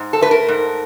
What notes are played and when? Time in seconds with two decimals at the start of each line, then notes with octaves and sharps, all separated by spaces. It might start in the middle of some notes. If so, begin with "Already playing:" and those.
Already playing: G#2
0.13 A4
0.21 A3 B4
0.31 A#4
0.49 G#2